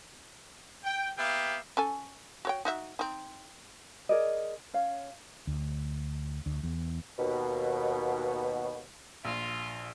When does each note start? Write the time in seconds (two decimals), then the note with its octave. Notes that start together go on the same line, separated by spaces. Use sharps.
0.84 G5
1.18 A#3 B3 G4 E5 F5 G5
1.77 C#4 A4 G#5
2.45 F#4 C#5 G5
2.65 D#4 F#4 E5
2.99 C4 D#4
4.09 G#4 A#4 D5 D#5
4.74 C#4 C#5 F5
5.47 D2
6.46 D2
6.63 E2
7.19 D#2 B2
9.25 A#1 F4